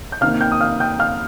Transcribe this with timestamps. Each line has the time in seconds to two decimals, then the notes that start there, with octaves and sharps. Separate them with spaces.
0.12 G6
0.21 C3 D#3 A#3 F5 F6
0.41 G5 G6
0.52 D#6
0.61 F5 F6
0.80 G5 G6
0.99 F5 F6